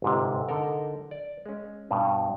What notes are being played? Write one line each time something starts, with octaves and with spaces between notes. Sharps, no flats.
G1 G#2 C3
D3 D#4 A4 A#4
D5
G#3 C#4
G2 B2